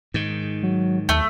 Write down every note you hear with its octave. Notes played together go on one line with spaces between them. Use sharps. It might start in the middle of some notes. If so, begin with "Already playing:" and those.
G#2 D#3
F#3
D#2 A3